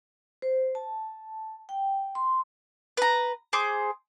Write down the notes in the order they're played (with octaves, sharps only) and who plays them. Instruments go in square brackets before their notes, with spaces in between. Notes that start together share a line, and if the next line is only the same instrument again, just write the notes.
[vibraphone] C5
A5
G5
C6
[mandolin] B4 A#5
G#4 C5 D6